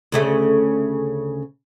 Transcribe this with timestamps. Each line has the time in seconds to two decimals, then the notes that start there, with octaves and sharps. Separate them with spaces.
0.12 D2 C#3 A3